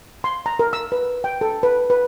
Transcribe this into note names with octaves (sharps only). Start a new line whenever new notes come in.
C6
A#5
A#4
E6
B4
G5
A4
B4
B4